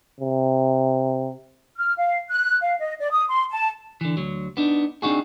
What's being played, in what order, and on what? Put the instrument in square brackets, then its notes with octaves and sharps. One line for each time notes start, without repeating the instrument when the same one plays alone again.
[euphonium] C3
[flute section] F6
F5
F#6
F5
D#5
D5
D#6
C6
A5
[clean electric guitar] D3 E3
D2 F#3
B3 D4 D#4
C4 D4 D#4 F#4 G#4